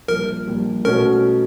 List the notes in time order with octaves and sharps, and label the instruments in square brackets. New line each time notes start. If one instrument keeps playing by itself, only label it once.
[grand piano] A#1 A#2 G3 [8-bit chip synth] A#4
[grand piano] A#1 A#2 G3
[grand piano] B2 F#3 A3 C#4 [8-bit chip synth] A#4